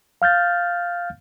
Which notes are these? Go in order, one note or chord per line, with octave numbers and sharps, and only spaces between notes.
F5 F6 G6 A6